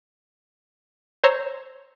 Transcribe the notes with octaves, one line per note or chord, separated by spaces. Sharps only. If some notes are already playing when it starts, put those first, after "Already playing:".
C5 C#5 A#5 E6 C7